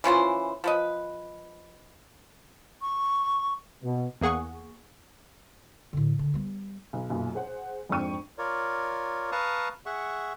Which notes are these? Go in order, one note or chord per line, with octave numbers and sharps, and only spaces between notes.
E3 C#4 F4 C5
F3 B4 D#5
C#6
B2
E2 A#3 G#4 F#5 C#6
A2 D3
D3
G3 B3
B1
B1 F#2 A#2
G#4 C5 F#5
F2 G#2 D4 G5 C#6 D#7
F4 A#4 C#5 D5
B4 F5 A5 A#5 C#6 D#6
G#4 E5 F#5 C#6